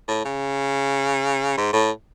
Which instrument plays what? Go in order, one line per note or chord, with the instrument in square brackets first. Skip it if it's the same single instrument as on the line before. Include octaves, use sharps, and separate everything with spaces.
[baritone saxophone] A2
C#3
G#2
A2